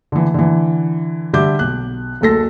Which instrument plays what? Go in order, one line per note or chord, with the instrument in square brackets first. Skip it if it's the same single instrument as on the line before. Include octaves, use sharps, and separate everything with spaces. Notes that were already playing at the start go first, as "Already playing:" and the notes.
[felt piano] D3 E3
D3 E3
D3 G3 G4 E5 D6 G6
B1 F#6
F#1 D2 A4 A#6